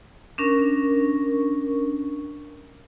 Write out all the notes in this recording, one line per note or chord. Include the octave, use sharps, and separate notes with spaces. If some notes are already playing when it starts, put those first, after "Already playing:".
C#4 D4 A#4 C#6